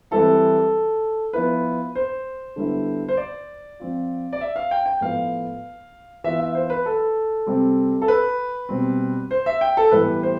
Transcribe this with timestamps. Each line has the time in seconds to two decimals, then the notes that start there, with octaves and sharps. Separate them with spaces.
0.11 E3 G3 C4 E4 A4
1.33 F3 B3 E4 B4
1.95 C5
2.56 D3 G3 B3 E4
3.09 C5
3.17 D5
3.80 F3 C4 F4
4.33 D5
4.41 E5
4.56 F5
4.71 G5
4.86 G5
5.01 A2 F3 B3 F5
6.24 E3 B3 F4 E5
6.40 E5
6.55 C5
6.70 B4
6.86 A4
7.47 C3 G3 C4
8.02 A4
8.08 B4
8.69 B2 G3 C4
9.31 C5
9.46 E5
9.61 G5
9.77 A4
9.91 A2 E3 G3 B3 E4 B4
10.23 C5